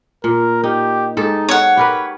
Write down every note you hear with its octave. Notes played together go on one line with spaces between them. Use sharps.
A#2 A#4
D#4 G4
G#2 D#4 G4 A4
C#5 F#5
G4 A#4 B4 B5